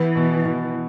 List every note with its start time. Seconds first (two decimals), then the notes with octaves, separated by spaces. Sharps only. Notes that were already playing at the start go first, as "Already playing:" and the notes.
Already playing: E3 B3
0.16 B2
0.45 B2